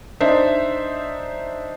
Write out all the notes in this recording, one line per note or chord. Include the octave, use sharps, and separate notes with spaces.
D4 D#4 C5 E5